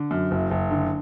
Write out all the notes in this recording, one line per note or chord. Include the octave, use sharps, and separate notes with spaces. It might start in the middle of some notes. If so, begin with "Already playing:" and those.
Already playing: D3
F#2
F#1
F#1
D3